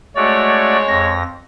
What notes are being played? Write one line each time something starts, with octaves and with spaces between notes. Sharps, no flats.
G#3 A3 F#4 C#5 D5
F2 A#6